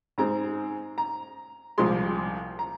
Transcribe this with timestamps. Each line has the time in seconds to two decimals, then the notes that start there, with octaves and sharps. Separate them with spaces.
0.18 G#2 G#3 C4 A#5
0.98 A#5
1.78 C2 A#2 F3 G#3 C6
2.59 A#5